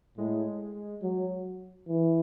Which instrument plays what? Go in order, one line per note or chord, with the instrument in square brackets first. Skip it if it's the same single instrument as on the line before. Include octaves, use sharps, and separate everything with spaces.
[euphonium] A2 [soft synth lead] G#3
[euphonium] F#3
E3